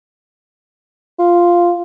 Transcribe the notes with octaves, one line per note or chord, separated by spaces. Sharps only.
F4